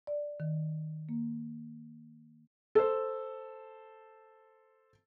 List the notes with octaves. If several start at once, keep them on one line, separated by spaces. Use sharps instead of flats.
D5
D#3
A#3
A4 C5